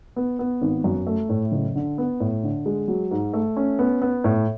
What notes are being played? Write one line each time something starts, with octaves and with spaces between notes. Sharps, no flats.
B3
B3
G#1
F#2
A3
A2
F#1
D3
B3
A2
D3
G#3
F#3
G#2
A3
C#4
B3
B3
A2